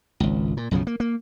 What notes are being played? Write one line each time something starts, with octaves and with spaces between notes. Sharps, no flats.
G#1 C#2
A#2
B1 F#2 C#3 F3
A#3
A#3